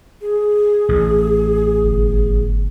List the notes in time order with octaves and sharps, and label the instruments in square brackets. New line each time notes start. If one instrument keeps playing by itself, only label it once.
[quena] G#4
[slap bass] A1
[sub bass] G1